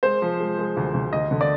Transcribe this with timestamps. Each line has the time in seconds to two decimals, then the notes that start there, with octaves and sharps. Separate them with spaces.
0.03 G#3 C5
0.22 F3
0.40 G#3
0.59 G#3
0.77 D2
0.94 D2
1.13 D2 D#5
1.31 D3
1.41 D5